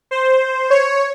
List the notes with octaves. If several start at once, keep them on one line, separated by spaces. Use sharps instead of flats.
C5
C#5